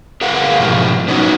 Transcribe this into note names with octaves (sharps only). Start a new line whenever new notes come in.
G#4 A#4 B4 F5 F#5
G#2 B2 F3 F4 G4
B3 C#4 D#4 F#4